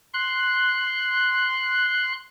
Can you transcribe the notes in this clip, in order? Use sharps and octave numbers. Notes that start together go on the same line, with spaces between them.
C6 F#6